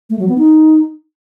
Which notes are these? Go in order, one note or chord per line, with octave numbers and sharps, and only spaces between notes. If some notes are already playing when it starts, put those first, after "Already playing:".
A3
F#3
B3
D#4